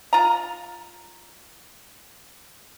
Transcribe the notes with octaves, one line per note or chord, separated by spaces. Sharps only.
F4 A#5